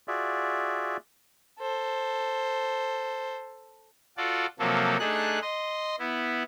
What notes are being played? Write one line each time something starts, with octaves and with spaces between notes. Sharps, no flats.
F4 F#4 G#4 D5 E5
A4 C5
F4 F#4 A4 D5
C3 F3 F#3 A#3 A4
A3 D4 D#4 G#4 F#6
D#5 C6
B3 E4